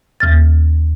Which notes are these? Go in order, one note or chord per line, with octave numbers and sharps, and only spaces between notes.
D#2 F6 A6